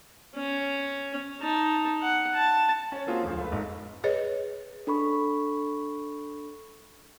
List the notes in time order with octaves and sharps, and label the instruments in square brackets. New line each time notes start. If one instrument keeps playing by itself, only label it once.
[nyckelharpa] C#4
D#4 A5
F#5
A5
[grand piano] C#4 C#5
A#3 C4 F4 F#4 G#4
E1 D2 F3
A3 B4
G#1 G#2
[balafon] G#4 B4 C#5 D#5
[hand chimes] D4 A4 B5 C#6